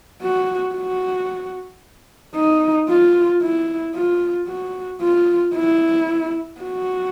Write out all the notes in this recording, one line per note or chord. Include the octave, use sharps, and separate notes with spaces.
F#4
F#4
D#4
F4
E4
F4
F#4
F4
E4
F#4